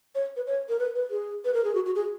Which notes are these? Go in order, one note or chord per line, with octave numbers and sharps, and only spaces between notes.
C#5
B4
C#5
A#4
B4
B4
G#4
B4
A#4
G#4
F#4
F#4
G#4